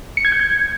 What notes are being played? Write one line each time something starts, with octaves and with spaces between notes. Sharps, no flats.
C#7
G#6
G6
G#6